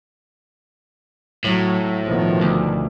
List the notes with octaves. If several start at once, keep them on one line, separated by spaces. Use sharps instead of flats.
A2 F#3
B2 D#3 F3
D2